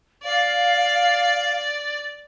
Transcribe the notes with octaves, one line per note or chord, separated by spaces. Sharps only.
D5 F5